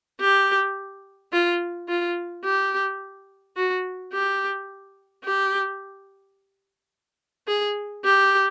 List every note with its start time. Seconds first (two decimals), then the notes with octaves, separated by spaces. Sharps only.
0.21 G4
1.33 F4
1.88 F4
2.44 G4
3.56 F#4
4.13 G4
5.24 G4
7.47 G#4
8.04 G4